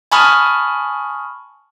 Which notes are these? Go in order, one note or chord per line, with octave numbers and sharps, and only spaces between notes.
G#5 A5 B5 C#6 D#6 F6